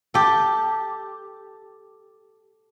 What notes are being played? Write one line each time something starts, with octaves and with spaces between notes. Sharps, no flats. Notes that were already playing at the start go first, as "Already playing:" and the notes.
G4 A4